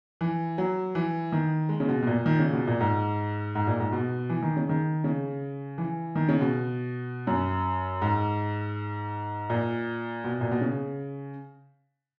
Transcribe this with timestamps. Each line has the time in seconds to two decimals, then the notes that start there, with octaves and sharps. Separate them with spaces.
0.21 E3
0.58 F#3
0.95 E3
1.32 D#3
1.69 G#3
1.80 C#3
1.88 B2
2.02 B2
2.07 A#2
2.26 D#3
2.39 C#3
2.53 B2
2.67 A#2
2.80 G#2
3.55 G#2
3.67 A#2
3.80 G#2
3.92 B2
4.29 E3
4.42 D#3
4.57 C#3
4.69 D#3
5.04 C#3
5.78 E3
6.15 D#3
6.29 C#3
6.41 B2
7.27 F#2
8.02 G#2
9.50 A#2
10.24 B2
10.41 A#2
10.51 B2
10.61 C#3